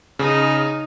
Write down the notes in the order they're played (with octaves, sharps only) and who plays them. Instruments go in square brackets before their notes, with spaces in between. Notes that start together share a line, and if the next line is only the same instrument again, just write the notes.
[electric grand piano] C#3 [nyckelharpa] D#4